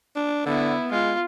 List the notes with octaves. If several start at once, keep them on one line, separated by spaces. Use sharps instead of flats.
D4
D3 B3 E4
G#3 F4